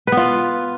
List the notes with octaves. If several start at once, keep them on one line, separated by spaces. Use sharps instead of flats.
B3 F4 B4